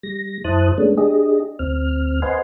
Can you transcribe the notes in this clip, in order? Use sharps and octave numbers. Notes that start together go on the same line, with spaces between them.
G3 A#6
F#2 E4 C5 A5 D#6 F#6
G#3 A3 B3 C#4 D4
D4 G4 G#4 D#5
D2 C4 F6
B4 C5 D#5 F#5 G#5 C6